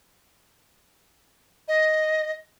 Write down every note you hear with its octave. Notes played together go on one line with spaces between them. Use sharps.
D#5